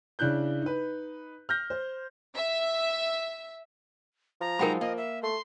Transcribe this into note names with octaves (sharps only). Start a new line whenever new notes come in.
C#3 D4 E4 F#6 G6
D#4 B4
F6 G6 A#6
C5
E5
F3 A#5
F#3 G#3 D#4 A#4 G5 B5
A#3 D#5
E5
A3 C6